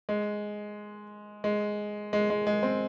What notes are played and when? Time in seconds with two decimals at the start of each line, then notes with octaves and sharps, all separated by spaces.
0.09 G#3
1.44 G#3
2.13 G#3
2.30 G#3
2.47 G#3
2.63 C4